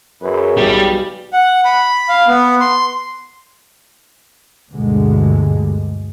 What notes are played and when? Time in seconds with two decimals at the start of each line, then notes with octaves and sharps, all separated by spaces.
0.21 F#2 G#4 B4
0.57 B1 G3 G4
1.33 F#5
1.65 B5
2.09 F5
2.27 B3
2.60 C6
4.70 D2 G2 B2 D3 G#3